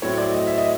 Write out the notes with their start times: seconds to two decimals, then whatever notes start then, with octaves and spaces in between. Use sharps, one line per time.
0.02 A2 F#3 A3 C4 C#5
0.18 D5
0.32 D#5
0.47 E5
0.58 D#5